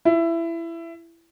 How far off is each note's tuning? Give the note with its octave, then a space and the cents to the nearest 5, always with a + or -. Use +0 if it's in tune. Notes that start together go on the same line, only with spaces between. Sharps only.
E4 +20